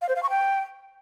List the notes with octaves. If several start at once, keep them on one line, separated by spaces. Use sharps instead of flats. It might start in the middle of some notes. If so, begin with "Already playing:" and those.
F5
C5
F5
C#6
G5